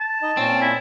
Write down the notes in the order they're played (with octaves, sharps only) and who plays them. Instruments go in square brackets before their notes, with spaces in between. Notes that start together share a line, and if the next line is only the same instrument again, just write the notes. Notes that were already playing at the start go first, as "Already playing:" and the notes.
[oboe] A5
[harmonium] D#4 D#5
[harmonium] A#2 C#4 [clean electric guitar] C4
[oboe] E4